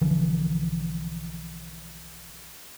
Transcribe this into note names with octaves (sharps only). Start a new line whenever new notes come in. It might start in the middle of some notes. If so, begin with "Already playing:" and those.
B1 D3 E3 F3